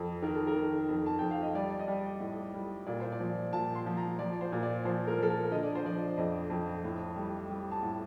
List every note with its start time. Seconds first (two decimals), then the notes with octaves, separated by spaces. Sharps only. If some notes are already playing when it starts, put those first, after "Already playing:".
Already playing: F2 A4
0.22 D#3 A#4
0.35 A4
0.47 A#4
0.55 D#3
0.89 F2
1.06 A5
1.19 F2 G5
1.31 F5
1.42 D#5
1.55 G3 D5
1.79 D#5
1.88 G3 D5
2.20 A2
2.54 G3
2.87 A#2 D5
3.00 C5
3.12 D5
3.20 F3
3.53 A#2 A5
3.75 C6
3.86 F3
3.97 A#5
4.19 F3 D5
4.41 C5
4.52 A#2
4.63 D5
4.85 F3 C5
5.07 A#4
5.18 F3 A4
5.29 A#4
5.51 D3 D#5
5.63 D5
5.75 C5
5.85 F3 D5
6.17 F2 D#5
6.50 F2
6.84 A2
7.16 G3
7.50 G3
7.71 A5
7.83 A2